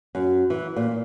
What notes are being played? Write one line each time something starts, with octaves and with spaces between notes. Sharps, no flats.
F#2
E3
A#2